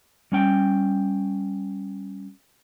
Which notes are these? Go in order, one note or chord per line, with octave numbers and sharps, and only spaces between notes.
G3 C#4 G5